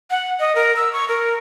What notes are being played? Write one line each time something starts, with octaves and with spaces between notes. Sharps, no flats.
F#5
D#5
A#4
E6
C#6
A#4